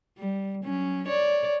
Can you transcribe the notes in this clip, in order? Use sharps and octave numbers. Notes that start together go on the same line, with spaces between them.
G3
F#3 C#4
C#5 D5